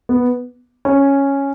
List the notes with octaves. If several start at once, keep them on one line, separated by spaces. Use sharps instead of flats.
B3
C#4